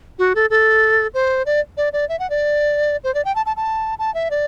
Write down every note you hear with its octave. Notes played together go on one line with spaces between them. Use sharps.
F#4
A4
A4
C5
D5
D5
D5
E5
F#5
D5
C5
D5
G5
A5
A5
A5
A5
E5
D5